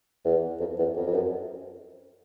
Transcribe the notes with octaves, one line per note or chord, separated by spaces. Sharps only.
E2
F2
E2
F2
F2
F#2